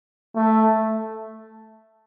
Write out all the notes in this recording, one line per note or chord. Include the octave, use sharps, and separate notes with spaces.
A3